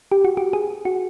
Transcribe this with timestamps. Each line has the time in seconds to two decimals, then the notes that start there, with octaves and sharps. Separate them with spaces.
0.12 G4
0.25 F#4
0.37 G4
0.53 G#4
0.85 F#4